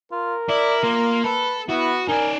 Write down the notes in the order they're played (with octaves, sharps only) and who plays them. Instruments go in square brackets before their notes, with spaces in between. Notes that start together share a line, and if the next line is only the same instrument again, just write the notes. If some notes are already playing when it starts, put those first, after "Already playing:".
[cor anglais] F4 [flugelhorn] A#4
[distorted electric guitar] E4 [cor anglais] D5
[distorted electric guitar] A#3 [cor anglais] F4
[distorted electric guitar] A4 [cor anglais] B4
[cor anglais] B3 [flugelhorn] E4 [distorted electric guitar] F#4
[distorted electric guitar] D#4 D5 [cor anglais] A#4 [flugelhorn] G#5